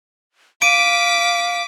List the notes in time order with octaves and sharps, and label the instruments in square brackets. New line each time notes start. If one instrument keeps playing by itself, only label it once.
[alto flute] F5 [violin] D6 B6 [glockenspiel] D7 D#7